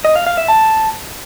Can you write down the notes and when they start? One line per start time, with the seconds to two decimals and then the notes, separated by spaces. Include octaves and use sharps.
0.05 D#5
0.16 F5
0.26 F5
0.37 E5
0.48 A5